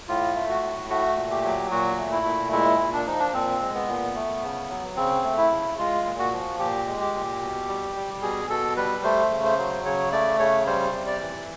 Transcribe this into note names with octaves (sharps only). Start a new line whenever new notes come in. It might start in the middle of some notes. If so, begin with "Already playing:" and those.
A2 F4
A3
F#4
A2
A3 F#4
A#2
G4
F#3
A#2 F#4
A3
E4
A#2
G#3 E4
A#2
D4
F3 D#4
D4
A#2 C4
G#3
B3
A#2
A3
C#3
F#3
C#3 C4
A3
E4
C#3
G#3 F4
A#2
F#4
F3
A#2 G4
G#3
G4
A#2
B2
G3
G3
B2 G#4
B2 A4
G3 B4
A3 C5
C#3
C5
F#3
C#3 C#5
A3 D5
C#3 C#5
G3 C5
C3
D5
E3